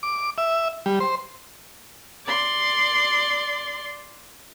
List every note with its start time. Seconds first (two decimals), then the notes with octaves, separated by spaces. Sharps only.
0.03 D6
0.38 E5
0.86 G3
1.00 C5
2.26 D5 C6